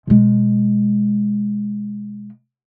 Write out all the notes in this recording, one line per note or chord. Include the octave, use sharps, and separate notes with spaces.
B2 G#3